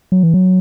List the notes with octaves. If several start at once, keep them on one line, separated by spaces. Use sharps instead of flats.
F#3
E3
F#3